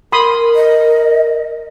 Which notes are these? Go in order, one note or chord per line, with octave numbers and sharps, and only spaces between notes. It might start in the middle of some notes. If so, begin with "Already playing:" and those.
A#4 B5 C6 D#6
D#5